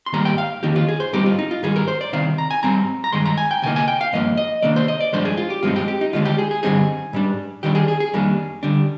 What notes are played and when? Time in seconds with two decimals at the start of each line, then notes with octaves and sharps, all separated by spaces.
0.06 C6
0.13 G#2 D#3 G3 A#3 A#5
0.25 G5
0.38 F5
0.63 F2 D#3 A#3 D#4 G4
0.76 F4
0.88 G#4
1.00 C5
1.13 G#2 G3 C4 D#4 G4
1.26 F4
1.39 D#4
1.51 F4
1.63 G#2 D#3 G3 G#4
1.76 A#4
1.88 C5
2.01 D5
2.13 C2 C3 D#3 F5
2.38 A#5
2.51 G#5
2.63 G#2 G3 C4 A#5
3.04 A#5
3.13 G2 D#3 G#3 C6
3.26 A#5
3.38 G#5
3.51 G5
3.62 D2 C3 A#3 D#4 G#5
3.76 G#5
3.88 G5
4.01 F5
4.13 G2 F3 A#3 D#5
4.37 D#5
4.62 C3 D#3 A#3 D4 D5
4.76 C5
4.88 D#5
5.00 D5
5.13 G2 F3 G#3 D4 C5
5.25 G#4
5.37 F4
5.50 G4
5.63 G2 F3 G#3 C4 D#4 F4
5.76 G4
5.88 G4
6.01 D#4
6.13 D#2 D3 F3 G#3 D4 F4
6.25 G4
6.38 G#4
6.51 G#4
6.63 G2 D3 G3 C4 D#4 G#4
7.13 G#2 G3 D4
7.63 D#2 D#3 G3 D4 G4
7.75 G#4
7.88 G#4
8.00 G#4
8.13 F2 D#3 G3 A#3 D4
8.63 D2 D3 G3 D4